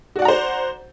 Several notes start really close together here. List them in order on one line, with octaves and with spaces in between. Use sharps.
F#4 D5 F#5 A#5 C5